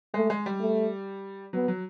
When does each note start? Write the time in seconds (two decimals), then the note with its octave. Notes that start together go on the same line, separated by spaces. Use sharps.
0.14 G#3 A3
0.30 G#3
0.46 G3
0.60 A3
1.53 F#3 B3
1.68 F#3